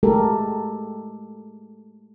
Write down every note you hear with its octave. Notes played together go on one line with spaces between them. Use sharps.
G#3 A3 G4 A4 A#4